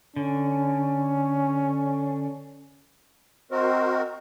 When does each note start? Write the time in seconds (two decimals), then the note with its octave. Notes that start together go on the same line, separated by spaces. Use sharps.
0.16 D3 C#4
3.51 C4 F#4 A#4 C5 D#5